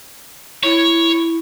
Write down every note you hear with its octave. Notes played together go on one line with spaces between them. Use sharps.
E4 C#5